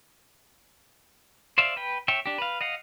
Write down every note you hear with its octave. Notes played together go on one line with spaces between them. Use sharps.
C5 D5 E5 F5
B4 G5
C#5 E5 G5
D4 G4
B4 F5
D#5 F5 F#5